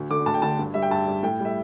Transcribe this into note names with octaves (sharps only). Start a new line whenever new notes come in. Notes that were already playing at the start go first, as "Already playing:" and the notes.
Already playing: D2
D3 A3 D6
D2 A5
G5
D3 A3 A5
G2
G3 E5
G5
G2 A5
G3
A2 G5
G3
E5